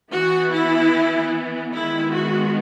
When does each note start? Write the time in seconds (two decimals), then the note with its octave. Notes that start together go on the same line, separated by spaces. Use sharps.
0.11 E3 B3 F#4
0.51 E4
1.73 D#3 G#3 B3 E4
2.13 F#4